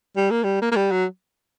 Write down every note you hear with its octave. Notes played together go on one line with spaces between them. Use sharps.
G3
A#3
G3
A#3
A#3
G3
F#3